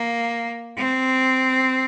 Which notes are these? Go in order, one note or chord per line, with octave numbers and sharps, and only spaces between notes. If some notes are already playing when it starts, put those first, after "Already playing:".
Already playing: A#3
C4